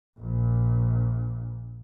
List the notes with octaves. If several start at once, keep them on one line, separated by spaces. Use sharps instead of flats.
A#1 A#2